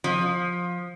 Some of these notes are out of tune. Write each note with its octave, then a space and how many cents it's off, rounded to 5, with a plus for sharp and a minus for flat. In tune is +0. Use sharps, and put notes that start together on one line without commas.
F3 +15